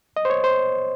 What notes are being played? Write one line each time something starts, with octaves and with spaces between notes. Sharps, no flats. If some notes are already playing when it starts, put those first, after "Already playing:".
D#5
C5
C#5
C5